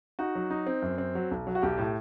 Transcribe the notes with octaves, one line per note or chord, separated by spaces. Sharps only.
D#4 F#4
F#3
D#4
C4
F#2
C4
F#3
B1
F#3
F#4
B1 G4
A2